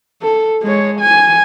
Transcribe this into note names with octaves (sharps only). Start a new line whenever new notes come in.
A4
G#3 C#5
G#5